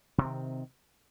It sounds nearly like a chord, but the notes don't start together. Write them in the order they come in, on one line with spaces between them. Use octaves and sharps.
C3 C4 D#3